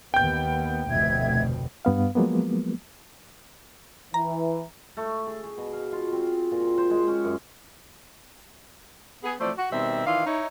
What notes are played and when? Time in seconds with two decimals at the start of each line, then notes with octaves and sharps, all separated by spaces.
0.14 D#2 B3 G5 G6
0.90 F1 D2 B2 E5 G#6
1.85 G2 B3 F5
2.15 F3 F#3 G#3 A#3 B3
4.14 E3 A#5
4.97 A3
5.27 G#4
5.44 G#4
5.58 B2
5.73 F5
5.92 F4
6.12 C4
6.51 A#2
6.78 C5
6.90 G#3
7.08 C#4
7.24 F#2
9.24 B3 G#4
9.40 E3 F3 A3 C4 C5 D5
9.57 F#4
9.71 B2 D#3 G3 C4 C5 E5
10.06 D#3 E3 D#4 F4 D5 F5
10.26 D#4 E4 C#5